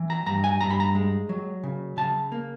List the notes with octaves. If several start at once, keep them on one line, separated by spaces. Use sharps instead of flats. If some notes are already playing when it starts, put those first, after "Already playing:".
Already playing: E3
A#5
G2 A#5
G#5
G2 A#5
B5
A#5
G#3
F#3
C#3
C#3 A5
A#3